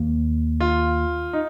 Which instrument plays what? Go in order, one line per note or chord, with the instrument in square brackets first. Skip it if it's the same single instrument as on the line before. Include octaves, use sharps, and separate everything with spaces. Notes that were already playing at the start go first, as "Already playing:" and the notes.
Already playing: [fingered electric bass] D#2 D#3 A#3
[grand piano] F4
D#4